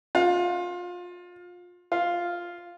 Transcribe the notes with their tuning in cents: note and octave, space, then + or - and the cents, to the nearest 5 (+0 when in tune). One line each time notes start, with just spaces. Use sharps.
F4 +25
F4 +0